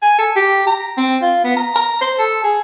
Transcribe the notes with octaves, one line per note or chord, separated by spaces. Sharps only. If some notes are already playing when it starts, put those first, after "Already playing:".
G#5
A4
G4
A#5
C4
F4
B3
A#5
A#5
C5
A4
G#4